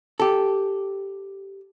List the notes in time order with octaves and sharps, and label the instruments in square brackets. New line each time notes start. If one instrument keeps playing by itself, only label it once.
[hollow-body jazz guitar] G4 A4